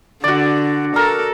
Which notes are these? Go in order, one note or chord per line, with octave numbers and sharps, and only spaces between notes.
D3 F#4 D5
A4 A#4